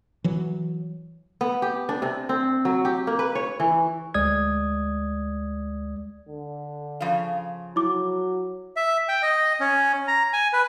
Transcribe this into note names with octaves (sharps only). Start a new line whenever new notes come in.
E3 F#3
B3
G4
D4
C3
C4
F#3
G4
A#3
B4
C#5
E3
D2 G#3 D5 D#6 G#6
D3
C#3 F3 F5
F#3 E4 D6
E5
G5
D#5
C#4
A#5
G#5
B4